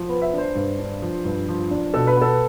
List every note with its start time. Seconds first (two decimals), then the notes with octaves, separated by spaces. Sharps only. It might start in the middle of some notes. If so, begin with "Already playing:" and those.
Already playing: F3
0.09 B3
0.22 E5
0.33 D4
0.38 C5
0.55 G2
0.78 D4
1.02 F3
1.25 G2
1.48 F3
1.71 D4
1.94 B2 A4
2.07 B4
2.17 B3
2.22 A4